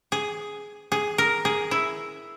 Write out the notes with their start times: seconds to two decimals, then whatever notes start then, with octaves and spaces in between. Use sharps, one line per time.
0.12 G#4
0.92 G#4
1.18 A#4
1.45 G#4
1.71 E4